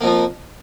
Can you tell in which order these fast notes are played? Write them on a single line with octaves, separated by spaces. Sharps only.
A#3 F2 F3